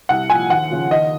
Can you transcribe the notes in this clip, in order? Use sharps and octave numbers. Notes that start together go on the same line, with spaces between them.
C2 F#5
A#2 F3 G#5
D#2 F#5
C#3 F3
D#2 D#5